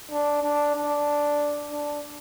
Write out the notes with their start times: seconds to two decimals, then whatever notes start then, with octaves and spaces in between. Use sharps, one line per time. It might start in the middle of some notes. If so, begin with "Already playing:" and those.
0.11 D4
0.43 D4
0.75 D4
1.71 D4